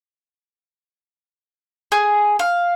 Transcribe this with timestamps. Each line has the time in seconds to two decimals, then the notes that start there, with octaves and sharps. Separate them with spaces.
1.92 G#4
2.39 F5